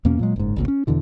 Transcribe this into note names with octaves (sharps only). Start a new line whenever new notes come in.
E2 B2 A#3 C#4
A#2 F#3 G#3
F#1 G#2
G#1 C#2 A#2
C#4
E2 B2 D3 E3